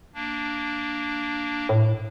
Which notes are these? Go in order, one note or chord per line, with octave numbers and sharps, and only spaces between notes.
A#3 D4
A2